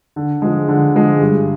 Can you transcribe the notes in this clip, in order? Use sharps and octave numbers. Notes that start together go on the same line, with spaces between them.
D3
F3 G#3
D3
F3 G#3
G2